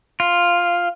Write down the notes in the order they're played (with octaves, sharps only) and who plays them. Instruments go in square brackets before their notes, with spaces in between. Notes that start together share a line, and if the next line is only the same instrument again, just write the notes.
[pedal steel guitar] F4